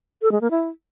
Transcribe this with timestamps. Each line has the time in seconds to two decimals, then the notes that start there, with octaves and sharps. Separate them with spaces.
0.22 A4
0.32 G#3
0.41 A#3
0.51 E4